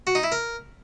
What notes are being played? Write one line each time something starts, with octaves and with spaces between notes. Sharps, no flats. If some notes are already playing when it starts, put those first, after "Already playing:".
F#4
D#4
E4
A#4